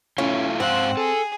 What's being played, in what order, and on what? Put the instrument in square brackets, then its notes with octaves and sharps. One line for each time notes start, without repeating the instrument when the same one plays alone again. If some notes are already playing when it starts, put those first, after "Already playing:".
[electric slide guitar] A3 E4 F4 [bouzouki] C#4
[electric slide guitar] G#2 C5 F5 [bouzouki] C4 [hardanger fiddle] F#5
[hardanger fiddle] G#4 [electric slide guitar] A4